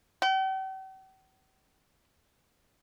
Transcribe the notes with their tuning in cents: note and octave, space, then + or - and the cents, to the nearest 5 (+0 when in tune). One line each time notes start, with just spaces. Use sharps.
G5 -45